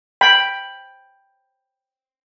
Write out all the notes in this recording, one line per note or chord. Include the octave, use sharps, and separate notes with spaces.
G5 B5